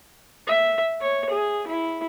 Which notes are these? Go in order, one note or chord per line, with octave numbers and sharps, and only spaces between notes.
E5
C#5
G#4
E4